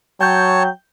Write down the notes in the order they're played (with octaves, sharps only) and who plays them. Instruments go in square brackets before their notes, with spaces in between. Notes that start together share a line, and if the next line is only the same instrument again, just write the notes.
[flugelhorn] F#3 [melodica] C#5 A5 [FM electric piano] G5 G6